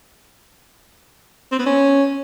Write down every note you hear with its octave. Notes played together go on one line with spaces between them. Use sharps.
C4
B3
C#4